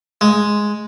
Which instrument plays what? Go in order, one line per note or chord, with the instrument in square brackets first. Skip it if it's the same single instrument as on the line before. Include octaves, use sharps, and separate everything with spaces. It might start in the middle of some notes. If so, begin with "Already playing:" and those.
[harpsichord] G#3